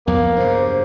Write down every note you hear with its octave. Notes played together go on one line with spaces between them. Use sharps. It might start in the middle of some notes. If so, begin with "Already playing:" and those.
B1 F2 A#3 B3
G2 C#3 C5